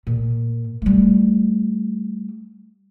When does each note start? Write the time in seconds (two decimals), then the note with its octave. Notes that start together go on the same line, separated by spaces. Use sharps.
0.07 A#2
0.82 G3 A3